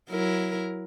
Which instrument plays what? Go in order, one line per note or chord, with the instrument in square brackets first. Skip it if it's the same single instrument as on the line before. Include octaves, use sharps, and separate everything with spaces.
[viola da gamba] F#3 E4 A#4